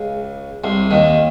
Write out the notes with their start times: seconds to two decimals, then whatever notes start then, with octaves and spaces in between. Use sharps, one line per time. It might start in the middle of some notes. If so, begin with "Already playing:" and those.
Already playing: C#2 C#3
0.64 C2 C3
0.91 D#2 D#3